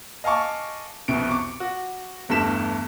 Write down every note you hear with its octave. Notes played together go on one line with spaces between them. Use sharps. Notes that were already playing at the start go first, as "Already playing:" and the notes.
D#5 F5 G#5 A5 C#6 D6
C2 F2 B2 D7
C#6 D6
F#4
G1 E2 G2 A3 B6 E7